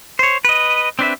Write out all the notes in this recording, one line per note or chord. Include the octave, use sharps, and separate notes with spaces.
C5 C#5
B4 D#5
C4 D4 B4 E5